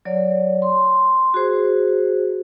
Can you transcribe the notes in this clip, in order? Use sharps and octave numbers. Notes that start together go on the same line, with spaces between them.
F#3 C#5 D5
C6
F#4 G#4 C5